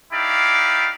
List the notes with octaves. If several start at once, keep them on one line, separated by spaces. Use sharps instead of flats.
D#4 E4 G4 D5 F5